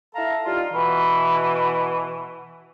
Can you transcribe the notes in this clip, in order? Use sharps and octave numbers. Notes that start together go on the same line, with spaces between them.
E4 A4 F5 A5 A#5
G3 D#4 F4
B2 E3